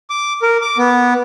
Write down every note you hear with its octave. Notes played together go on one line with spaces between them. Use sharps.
D6
A#4
D6
B3